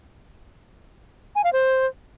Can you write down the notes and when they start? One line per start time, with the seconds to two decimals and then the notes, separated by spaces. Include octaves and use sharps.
1.36 G#5
1.44 F5
1.53 C5